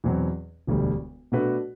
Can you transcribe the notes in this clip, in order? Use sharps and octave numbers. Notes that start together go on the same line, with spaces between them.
E2 B2 F#3 C4
E1 D2 D3 G3
B2 A3 D4 F#4 B4